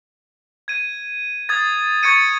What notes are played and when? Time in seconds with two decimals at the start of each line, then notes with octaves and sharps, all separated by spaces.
0.68 G#6 D#7
1.49 D#6 G#6 A6
2.03 C#6 G#6 A6 C#7 D#7